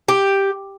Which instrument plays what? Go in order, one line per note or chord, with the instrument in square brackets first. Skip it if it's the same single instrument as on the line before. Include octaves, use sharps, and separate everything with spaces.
[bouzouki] G4